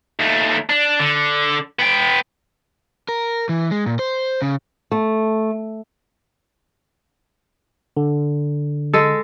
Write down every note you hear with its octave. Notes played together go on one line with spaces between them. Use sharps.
D#2 A3
D4
D3
B3 G5
A#4
E3
G#3
A#2
C5
C#3
A3
D3
G#3 A4